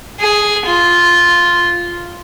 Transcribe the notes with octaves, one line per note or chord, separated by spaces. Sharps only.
G#4
F4